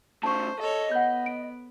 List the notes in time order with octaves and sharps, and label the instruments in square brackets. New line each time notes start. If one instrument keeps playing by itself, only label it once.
[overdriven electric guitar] C#3 A3 [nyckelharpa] C5 [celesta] A5 C#6
[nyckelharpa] A4 C#5 [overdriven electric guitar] D#5
[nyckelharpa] B3 [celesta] F#5 G6
[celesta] D7